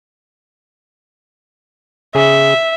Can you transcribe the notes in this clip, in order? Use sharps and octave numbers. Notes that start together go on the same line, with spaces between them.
C#3 G#4 E5